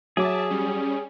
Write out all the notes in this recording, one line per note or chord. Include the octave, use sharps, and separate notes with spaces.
F#3 G#4 E5 A5 D6
G3 C#4